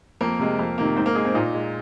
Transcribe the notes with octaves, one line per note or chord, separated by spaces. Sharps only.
F2 A#3 A#4
C3 G#3
F2
C3 D#3 A#3
G#2 C4 C5
A#3 A#4
G#3 G#4
C4
A#2 D#4
G#3